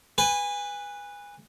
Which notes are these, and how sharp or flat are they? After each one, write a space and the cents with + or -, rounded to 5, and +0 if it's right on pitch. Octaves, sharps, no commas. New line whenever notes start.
B4 +0 G#5 -25